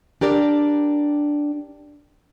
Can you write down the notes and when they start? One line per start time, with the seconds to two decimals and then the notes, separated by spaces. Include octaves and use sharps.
0.21 D4 G4 A#4 D5